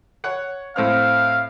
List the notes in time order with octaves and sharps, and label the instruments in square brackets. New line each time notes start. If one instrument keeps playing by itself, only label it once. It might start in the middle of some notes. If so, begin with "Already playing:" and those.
[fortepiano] C#5 F#5
[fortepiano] A2 C4 F6 [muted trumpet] F5